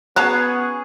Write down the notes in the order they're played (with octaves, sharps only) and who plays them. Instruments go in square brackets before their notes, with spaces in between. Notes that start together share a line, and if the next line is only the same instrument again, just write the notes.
[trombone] B3 [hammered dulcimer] C#4 G#4 F#5 [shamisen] F#4 A5 A#5 [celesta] F#6